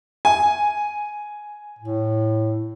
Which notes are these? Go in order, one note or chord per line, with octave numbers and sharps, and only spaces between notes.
G#5
A2